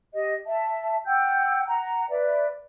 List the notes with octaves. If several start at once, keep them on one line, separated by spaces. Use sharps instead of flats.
G4 D#5
E5 A5
F#5 G5 E6 G6
F#5 A#5
B4 D5 E5